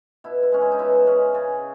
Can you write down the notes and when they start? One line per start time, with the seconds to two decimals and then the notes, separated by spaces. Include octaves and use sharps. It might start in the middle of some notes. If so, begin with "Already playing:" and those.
0.24 B2 E4
0.43 E4
0.52 G#3 C#4
0.61 E4
0.72 D#4
0.79 B2 E4
1.07 G#3 C#4
1.34 C#3